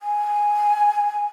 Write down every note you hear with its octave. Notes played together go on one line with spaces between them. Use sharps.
G#5